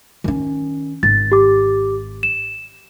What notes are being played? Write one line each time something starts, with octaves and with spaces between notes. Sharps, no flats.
D#3 C#4
G#1 A6
G4 D6
E7